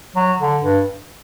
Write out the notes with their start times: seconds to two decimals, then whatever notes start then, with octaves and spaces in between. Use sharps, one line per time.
0.16 F#3
0.39 D3
0.63 G2